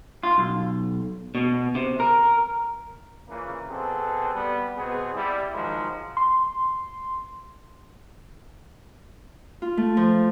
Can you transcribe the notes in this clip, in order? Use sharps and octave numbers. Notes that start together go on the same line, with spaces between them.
F4
B1
B2
C3
A#4
A#2 C#3 E3 A#3
B2 C4 F#4 G#4 A4
G3 B3
B2 B3 C4 G#4
G3 E4
D#3 F3 F#3 G#3
C6
F4
A3
F3